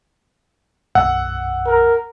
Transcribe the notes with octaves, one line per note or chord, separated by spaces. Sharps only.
B1 F#2 F#5 E6
A#4